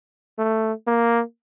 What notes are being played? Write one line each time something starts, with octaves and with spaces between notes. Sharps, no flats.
A3
A#3